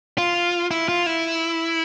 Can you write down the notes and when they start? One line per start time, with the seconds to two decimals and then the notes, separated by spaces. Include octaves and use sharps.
0.18 F4
0.71 E4
0.89 F4
1.06 E4